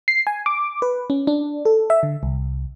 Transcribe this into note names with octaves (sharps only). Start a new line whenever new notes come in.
C7
G#5
D6
B4
C#4
D4
A4
E5
D3
C2